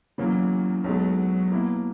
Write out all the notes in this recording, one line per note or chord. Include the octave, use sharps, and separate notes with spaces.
E2 C#3 E3 F#3 A#3
B1 B2 F#3 G#3
B2 A#3 E4